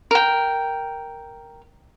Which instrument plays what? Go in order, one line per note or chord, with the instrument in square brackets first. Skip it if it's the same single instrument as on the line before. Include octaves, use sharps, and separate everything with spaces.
[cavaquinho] A#4 G5